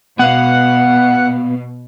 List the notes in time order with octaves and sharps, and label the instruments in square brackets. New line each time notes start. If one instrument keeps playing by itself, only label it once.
[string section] B2 [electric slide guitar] B3 F5 [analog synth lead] F#5